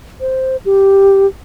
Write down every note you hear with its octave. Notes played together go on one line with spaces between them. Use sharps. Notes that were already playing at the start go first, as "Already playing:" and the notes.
C5
G4